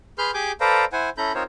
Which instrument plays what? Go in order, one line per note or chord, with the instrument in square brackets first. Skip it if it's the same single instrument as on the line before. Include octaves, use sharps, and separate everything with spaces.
[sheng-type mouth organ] G#4 B4 C6 F6 G6
G4 G#4 G#5 D6 G6
A4 B4 C5 D5 F5 A#5
E4 C5 F#5 G#5
C#4 E4 A4 A#5 B5 G6
C4 D#4 F4 A#4 C5 C#5